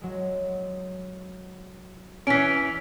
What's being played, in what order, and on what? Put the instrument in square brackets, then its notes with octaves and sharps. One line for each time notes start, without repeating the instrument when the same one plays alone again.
[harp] F#3 G#3
[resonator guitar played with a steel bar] E3 C#4 [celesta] B6 D7